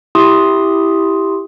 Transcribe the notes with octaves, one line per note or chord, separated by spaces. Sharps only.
E4 G4 C6 D#6